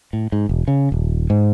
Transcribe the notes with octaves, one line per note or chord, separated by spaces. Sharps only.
A2
G#2
E1
C#3
D#1
G#2